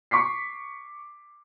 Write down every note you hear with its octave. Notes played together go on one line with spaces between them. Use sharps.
C#6 D6 B6 C7